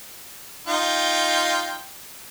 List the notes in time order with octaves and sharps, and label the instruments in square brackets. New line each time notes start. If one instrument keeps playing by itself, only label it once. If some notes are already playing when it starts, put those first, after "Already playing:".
[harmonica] D#4 F4 G5